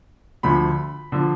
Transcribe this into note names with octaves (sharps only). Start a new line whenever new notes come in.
D2 D3 F3 B5
D3 F3